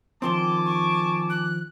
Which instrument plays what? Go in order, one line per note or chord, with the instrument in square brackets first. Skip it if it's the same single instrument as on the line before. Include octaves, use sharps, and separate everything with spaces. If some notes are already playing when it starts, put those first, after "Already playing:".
[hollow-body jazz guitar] D#3 F3 C4 [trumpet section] G#5 A5 D6 [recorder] C6
[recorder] C#6
F#6